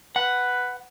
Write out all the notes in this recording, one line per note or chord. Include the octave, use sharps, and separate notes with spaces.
B4 F#5